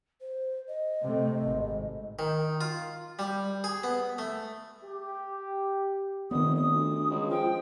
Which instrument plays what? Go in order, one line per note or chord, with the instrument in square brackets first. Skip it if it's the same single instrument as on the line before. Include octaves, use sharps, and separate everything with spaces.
[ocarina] C5
D#5
[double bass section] C3 A3
G#1
[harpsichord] D#3
F4
G3
G#4
B3
A3
[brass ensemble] G4
[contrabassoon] F1 [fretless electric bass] D#3 B3 [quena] D#6
[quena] D#6
[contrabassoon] D2
C#2
[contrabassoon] F3 [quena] G5